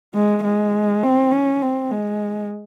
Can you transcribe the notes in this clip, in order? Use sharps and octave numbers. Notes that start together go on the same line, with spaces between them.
G#3
G#3
C4
C#4
C4
G#3